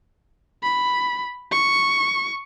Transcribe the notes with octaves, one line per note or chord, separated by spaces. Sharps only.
B5
C#6